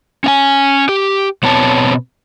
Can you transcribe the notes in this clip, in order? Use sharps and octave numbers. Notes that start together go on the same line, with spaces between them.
C#4 F5 G#5
G4
B2 B3 C4 C#5 A5